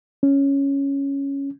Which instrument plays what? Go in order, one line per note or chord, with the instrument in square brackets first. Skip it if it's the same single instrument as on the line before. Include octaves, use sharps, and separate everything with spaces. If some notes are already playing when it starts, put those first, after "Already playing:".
[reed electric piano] C#4